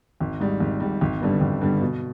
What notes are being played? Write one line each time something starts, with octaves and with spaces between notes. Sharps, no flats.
G#1
G#2 G3
G#1
G#2 G3
G#1
G2 D3 G3 B3
G#1
G2 D3 G3 B3
B2